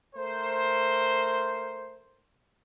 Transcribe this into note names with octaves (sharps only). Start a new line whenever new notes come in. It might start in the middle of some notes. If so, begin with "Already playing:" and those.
A3 A#4 C5